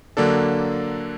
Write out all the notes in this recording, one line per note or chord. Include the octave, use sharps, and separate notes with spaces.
D3 F#3 A#3 D4 A4